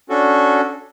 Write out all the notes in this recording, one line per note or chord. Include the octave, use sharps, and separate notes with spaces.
C#4 D4 F#4 A4